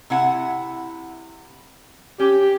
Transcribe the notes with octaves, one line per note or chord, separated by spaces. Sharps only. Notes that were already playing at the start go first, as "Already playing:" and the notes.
C3 E4 F#5
C#4 G4